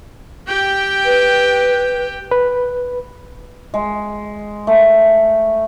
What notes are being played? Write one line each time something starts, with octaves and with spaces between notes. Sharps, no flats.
G4 G5
B4
B4
G#3
A3